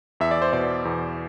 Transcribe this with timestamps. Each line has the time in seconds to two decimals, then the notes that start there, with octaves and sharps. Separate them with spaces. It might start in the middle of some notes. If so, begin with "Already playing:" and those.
0.20 E2 E5
0.31 D5
0.42 C5
0.53 B2 D5
0.85 E2